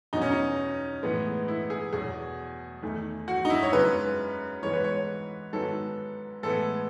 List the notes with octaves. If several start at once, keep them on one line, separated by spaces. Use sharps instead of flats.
E2 B2 F#3 D#4
C#4
D#4
A2 E3 G#3 B3
E4
G#4
E2 B2 F#3 G#4
E2 D#3 A3
F#4
D#4
E4
C#5
F#2 C#3 G#3 B3 B4
G#2 E3 G#3 B3 C#5
B4
C#5
G#2 D#3 F#3 B3 A4
A2 E3 G#3 B3 A4